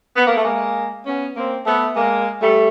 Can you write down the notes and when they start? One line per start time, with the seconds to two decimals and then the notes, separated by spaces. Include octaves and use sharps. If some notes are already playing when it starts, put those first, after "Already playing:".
0.16 B3
0.26 A#3
0.35 A3
0.43 G#3 A#3
1.06 B3 C#4
1.36 A#3 C4
1.66 A3 B3
1.95 G#3 A#3
2.40 G3 A3